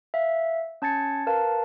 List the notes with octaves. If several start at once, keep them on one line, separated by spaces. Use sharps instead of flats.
E5 F5
C#4 A5 G#6 A6 C#7
A#4 B4 F5 A5